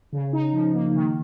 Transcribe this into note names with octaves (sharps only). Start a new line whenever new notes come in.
C#3
D#4
F3
A#3
D#3